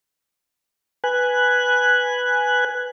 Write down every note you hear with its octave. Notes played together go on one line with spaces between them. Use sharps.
B4 G#5 F#6